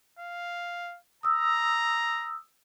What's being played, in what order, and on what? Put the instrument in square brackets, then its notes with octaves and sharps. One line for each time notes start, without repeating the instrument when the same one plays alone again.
[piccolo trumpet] F5
[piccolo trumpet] A#5 [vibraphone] D#6 E6